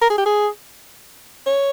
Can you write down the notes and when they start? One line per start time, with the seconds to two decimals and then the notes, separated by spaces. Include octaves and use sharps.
0.02 A#4
0.10 G#4
0.18 G4
0.26 G#4
1.46 C#5